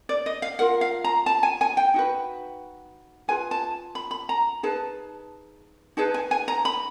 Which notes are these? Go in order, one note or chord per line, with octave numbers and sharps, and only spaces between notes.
D5
D#5
F5
F4 A#4 F#5
F5
A#5
A5
G#5
G#5
G5
D#4 F#4 B4
F4 G#4 B4 G#5
A5
B5
B5
A#5
D#4 G#4 B4 A5
D#4 G#4 B4 A5
G#5
G#5
A#5
B5